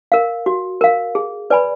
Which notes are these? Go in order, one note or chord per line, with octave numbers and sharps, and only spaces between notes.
A#4 F5
F#4
A#4 F5
G#4
B4 D5 G#5 B5